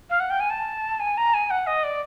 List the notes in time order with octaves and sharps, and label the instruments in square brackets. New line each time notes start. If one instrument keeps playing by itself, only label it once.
[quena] F5
F#5
G5
G#5
A5
G#5
A#5
G#5
F#5
D#5
D5